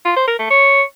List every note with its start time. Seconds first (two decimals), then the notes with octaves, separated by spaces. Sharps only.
0.05 F4
0.16 C5
0.28 A#4
0.39 A3
0.50 C#5